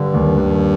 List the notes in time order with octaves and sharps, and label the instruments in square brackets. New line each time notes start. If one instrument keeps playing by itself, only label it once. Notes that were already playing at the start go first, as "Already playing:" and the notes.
Already playing: [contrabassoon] G2 [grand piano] D3
[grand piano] D#2
D#2